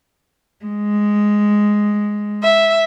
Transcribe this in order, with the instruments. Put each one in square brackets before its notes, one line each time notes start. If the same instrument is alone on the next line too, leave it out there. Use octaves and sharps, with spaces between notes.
[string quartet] G#3
[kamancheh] E5